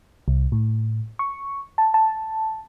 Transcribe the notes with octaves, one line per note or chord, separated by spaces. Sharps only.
C2
A2
C#6
A5
A5